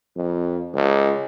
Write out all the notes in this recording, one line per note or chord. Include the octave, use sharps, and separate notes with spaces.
F2
C#2